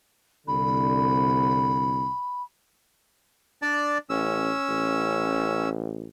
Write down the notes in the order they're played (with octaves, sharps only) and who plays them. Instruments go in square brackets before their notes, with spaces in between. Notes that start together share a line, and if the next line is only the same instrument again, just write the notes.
[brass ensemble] C2 D3 [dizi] B5
[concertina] D4 D5 A5
[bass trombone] A1 [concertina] C#4 E6
[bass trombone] A1